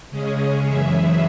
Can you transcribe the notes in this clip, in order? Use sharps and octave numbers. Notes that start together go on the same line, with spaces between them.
C#3 G#3 C#4 G#4
F#2 E3 C#4 G#4 E5